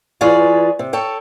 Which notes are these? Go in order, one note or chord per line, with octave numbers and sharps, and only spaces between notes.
E3 F4 G#4 B4 C#5 D5
C3
A4 C#5 G5